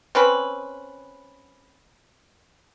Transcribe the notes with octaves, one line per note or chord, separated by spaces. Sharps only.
C4 C#4 B4